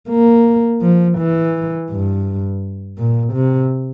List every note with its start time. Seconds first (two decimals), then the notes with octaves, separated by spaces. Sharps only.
0.10 A#3
0.82 F3
1.18 E3
1.90 G2
2.98 A#2
3.34 C3